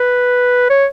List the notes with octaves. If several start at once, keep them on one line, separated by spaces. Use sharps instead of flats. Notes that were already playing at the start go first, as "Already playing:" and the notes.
Already playing: B4
C#5